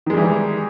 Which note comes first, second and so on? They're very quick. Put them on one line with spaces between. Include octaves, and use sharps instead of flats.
D#3 G#3 G3 E3